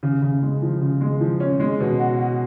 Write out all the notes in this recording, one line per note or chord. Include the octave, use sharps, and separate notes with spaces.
C#3
C#3
G#3
F3
C#3
G#3
F3
C#4
G#3
B2
F#4
F#4